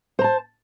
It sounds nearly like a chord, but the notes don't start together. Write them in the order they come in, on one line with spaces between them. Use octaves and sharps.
C5 A#5 A5